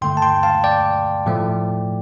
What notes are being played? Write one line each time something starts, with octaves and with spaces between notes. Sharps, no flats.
G2 D3 A3 G5 C6
A5
G5 C6
F5 A5
D5 G5
A2 F3 A3